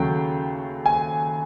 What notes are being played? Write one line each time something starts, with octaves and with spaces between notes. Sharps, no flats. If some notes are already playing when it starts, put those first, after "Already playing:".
Already playing: D#2 C#3 F#3 A3 G5
G#5